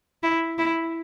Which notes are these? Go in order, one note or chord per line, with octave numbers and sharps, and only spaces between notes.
E4
E4